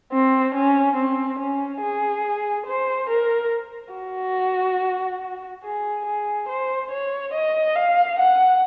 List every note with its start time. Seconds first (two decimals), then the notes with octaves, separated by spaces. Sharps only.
0.12 C4
0.55 C#4
0.97 C4
1.39 C#4
1.82 G#4
2.66 C5
3.09 A#4
3.94 F#4
5.63 G#4
6.06 G#4
6.49 C5
6.91 C#5
7.34 D#5
7.75 F5
8.19 F#5